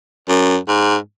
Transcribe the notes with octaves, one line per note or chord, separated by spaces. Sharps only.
F#2
G#2